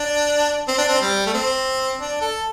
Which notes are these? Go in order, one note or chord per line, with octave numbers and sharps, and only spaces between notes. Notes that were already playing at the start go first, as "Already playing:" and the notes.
Already playing: D4
C4
D4
C4
G3
A3
C4
D4
A4